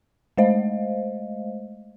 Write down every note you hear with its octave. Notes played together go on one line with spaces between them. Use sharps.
G#3 A3 C5 D#5 F5